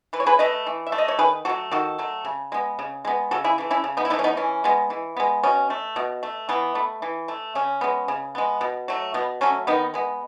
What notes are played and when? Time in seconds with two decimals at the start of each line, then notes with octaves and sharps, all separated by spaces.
0.13 E3 B4
0.20 C#5
0.26 G#4 B4
0.39 A3 B4 D#5
0.66 E3
0.87 E5
0.92 A3
0.98 D#5
1.08 C#5
1.19 D#3 G#4 B4
1.45 F#3 F#4 A4
1.49 A3
1.71 D#3 F#4 A4
1.98 F#3 A3
2.25 C#3
2.52 G#3 B3
2.79 C#3
3.05 G#3 B3
3.31 C#3 F#4 A4
3.44 E4 G#4
3.58 E3 A3
3.71 C#4 E4
3.84 C#3
3.97 B3 D#4
4.05 E4
4.10 E3 B3 D#4
4.14 A3
4.19 C#4
4.24 B3 D#4
4.37 E3 C#4
4.64 G#3 B3
4.90 E3
5.17 G#3 B3
5.43 B2 C#4
5.70 A3
5.96 B2
6.23 A3
6.49 E3 B3
6.75 A3
7.02 E3
7.28 A3
7.55 C#3 C#4
7.81 G#3 B3
8.08 C#3
8.35 G#3 B3
8.61 B2
8.88 F#3 A3
9.14 B2 B3
9.41 F#3 A3 C#4
9.67 D#3 B3 D#4
9.94 G#3 B3